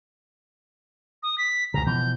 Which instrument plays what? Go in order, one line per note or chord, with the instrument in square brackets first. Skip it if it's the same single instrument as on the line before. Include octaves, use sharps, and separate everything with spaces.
[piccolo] D#6
B6
[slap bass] C#2 G2 C#3 [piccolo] A#5
[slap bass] B2 E3 F3 [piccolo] G6